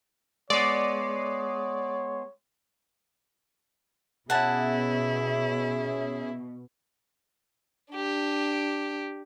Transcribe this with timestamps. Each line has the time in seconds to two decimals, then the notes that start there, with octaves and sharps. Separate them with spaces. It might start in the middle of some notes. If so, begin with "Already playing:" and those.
0.50 G#3 B3 C#5 D5
4.30 B2 C#4 E4 G#4 E5 F#5 G#5 A5
7.94 D4 G4